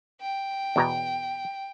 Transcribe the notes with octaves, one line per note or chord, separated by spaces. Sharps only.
G5
E2 B2 A#5